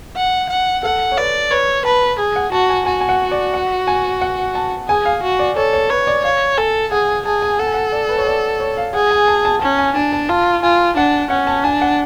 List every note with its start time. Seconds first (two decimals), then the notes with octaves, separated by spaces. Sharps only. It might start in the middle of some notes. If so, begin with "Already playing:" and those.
0.16 F#5
0.49 F#5
0.83 A4 F#5
1.12 C#5
1.17 B4 D5
1.51 B4 C#5
1.85 B4 A5
2.19 G#4
2.36 F#5
2.52 F#4 A5
2.70 G#5
2.86 F#4 G#5
3.01 G#5
3.09 F#5
3.31 D5
3.54 F#5
3.87 G#5
4.21 F#5
4.55 A5
4.88 G#4 G#5
5.05 F5
5.23 F#4
5.39 D5
5.57 A4 C#5
5.73 C#5
5.90 B4 C#5
6.07 D5
6.24 C#5 F5
6.58 A4 G#5
6.92 G#4 F#5
7.09 G#5
7.25 G#4 A5
7.42 G#5
7.59 A4 F#5
7.67 G#5
7.74 F#5
7.92 D5
8.09 B4
8.18 C#5
8.26 D5
8.60 C#5
8.77 F5
8.94 G#4 F#5
9.11 G#5
9.28 A5
9.45 A5
9.61 C#4 A5
9.79 G#5
9.95 D4 G#5
10.13 A5
10.29 F4 A5
10.62 F4 G#5
10.97 D4 F#5
11.30 C#4 F#5
11.47 A5
11.64 D4 G#5
11.81 F#5